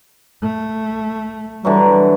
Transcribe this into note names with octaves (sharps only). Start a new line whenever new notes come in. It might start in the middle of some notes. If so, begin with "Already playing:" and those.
A3
D3 E3 F#3 G3